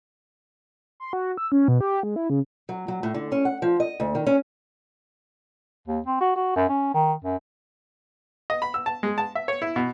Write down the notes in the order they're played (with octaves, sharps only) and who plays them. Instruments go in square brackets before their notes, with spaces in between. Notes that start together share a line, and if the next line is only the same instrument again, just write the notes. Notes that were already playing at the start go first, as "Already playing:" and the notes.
[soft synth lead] C6
F#4
E6
C#4
B2
G4
G#3
E4
C#3
[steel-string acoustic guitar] F#3
F#3
A2
D3
C#4
F#5
F3
D#5
D2
D#3
C#4
[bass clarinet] D#2
C4
F#4
F#4
F#2
C#4
D#3
F#2
[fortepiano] D#5
B5
E6
A5
G#3
A5
E5
C#5
E4
B2